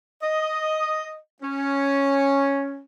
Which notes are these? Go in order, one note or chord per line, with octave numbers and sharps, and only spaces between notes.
D#5
C#4